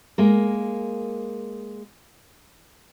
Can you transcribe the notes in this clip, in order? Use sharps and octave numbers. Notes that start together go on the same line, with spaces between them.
G#3 A#3 A#4